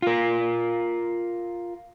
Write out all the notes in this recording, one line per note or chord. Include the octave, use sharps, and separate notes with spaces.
F4 A#4